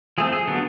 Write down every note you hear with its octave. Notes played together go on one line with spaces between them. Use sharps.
F3 A3 C4 G#4
G#4
D3 F#3 B3